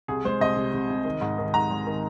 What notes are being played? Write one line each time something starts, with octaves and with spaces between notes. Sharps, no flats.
C2 G#4
G#3 C5
C2 D#5
C3
C3
C2
D#3
G#2
D#3
G#2 A#5
G#3
D#3